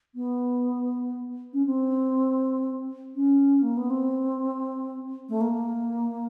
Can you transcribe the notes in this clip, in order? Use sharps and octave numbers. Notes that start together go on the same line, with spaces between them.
B3
C#4
C4
C#4
A#3
B3
C4
A3
A#3